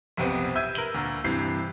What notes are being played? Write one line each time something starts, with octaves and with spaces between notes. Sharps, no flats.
B1 F2 C3 B3 C4
E5 E6 G6 G#6 D#7
A#4 B4 F#7 G7
D2 A#2
G2 C3 E3 G6 C7